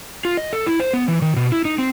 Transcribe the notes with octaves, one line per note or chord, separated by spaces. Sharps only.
F4
D#5
A4
E4
C5
B3
E3
D#3
B2
E4
D#4
C4